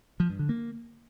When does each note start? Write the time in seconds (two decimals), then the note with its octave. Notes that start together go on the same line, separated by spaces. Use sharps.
0.20 F3
0.30 G2
0.39 D3
0.49 A#3